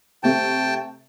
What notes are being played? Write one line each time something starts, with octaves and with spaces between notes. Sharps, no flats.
C3 A3 G5 A5